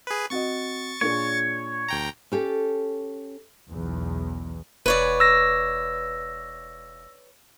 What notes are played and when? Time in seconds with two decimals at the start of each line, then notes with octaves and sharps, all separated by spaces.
0.07 G#4 B4
0.30 C4 F#4 D#5 C#6 A6
1.01 A#2 D4 G#4 C#5
1.88 D2 G5 A#5
2.32 C#4 G4 A4
3.71 B1 E2
4.86 E1 B4 C#5 D5
5.20 E6 A#6